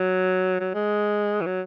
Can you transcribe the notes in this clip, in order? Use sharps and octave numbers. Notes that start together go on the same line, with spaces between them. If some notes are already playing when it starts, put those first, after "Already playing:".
Already playing: F#3
F#3
G#3
E3
F#3